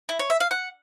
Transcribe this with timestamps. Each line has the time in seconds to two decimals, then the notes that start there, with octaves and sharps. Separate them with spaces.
0.09 E4
0.19 C#5
0.30 E5
0.40 F5
0.51 F#5